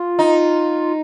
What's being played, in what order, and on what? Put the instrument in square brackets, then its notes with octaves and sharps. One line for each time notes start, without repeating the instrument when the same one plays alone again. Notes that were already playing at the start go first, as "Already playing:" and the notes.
Already playing: [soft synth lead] F4
[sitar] D#4